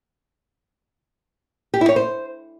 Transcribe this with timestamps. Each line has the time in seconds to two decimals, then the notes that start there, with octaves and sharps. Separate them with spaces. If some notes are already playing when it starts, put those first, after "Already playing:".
1.74 G4
1.81 E4
1.89 C#5
1.96 C5